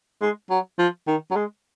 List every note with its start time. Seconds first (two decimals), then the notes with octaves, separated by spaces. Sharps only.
0.22 G#3
0.50 F#3
0.79 F3
1.07 D#3
1.31 F#3
1.36 G#3